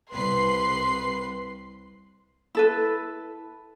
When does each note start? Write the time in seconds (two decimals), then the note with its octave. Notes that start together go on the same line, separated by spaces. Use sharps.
0.12 C2 B4 C6 C7
2.55 E4 A4 B4